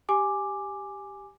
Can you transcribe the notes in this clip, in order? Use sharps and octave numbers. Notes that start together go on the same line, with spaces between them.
G4 G#5 D6